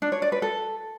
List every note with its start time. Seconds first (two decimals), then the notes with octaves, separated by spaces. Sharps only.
0.02 D4
0.12 C#5
0.22 D5
0.32 B4
0.42 A4